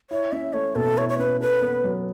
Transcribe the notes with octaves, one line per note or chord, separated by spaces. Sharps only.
E4 C#5
C#4 E5
A3 C#5
B2 A4
E4 C#5
C#5
C#4 B4
A4 B4
B3
F#3